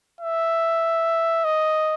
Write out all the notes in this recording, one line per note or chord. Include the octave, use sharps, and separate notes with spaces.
E5
D#5